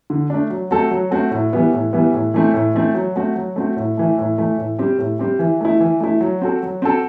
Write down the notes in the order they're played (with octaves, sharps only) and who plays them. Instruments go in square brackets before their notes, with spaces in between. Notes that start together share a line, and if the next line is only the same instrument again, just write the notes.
[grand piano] D3
A3 D4
F#3
A3 C4 F#4 A4
F#3
A3 C4 F#4 A4
A2
E3 G3 B3
A2
E3 G3 B3
A2
E3 A3 C4
A2
E3 A3 C4
F#3
A3 C4 F#4
F#3
A3 C4 F#4
A2
E3 A3
A2
E3 A3
A2
G3 C4 G4
A2
G3 C4 G4
E3
A3 E4
E3
A3 E4
F#3
C4 F#4 A4
F#3
C4 F#4 A4